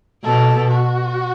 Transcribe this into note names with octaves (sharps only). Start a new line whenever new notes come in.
B2 A4
F#4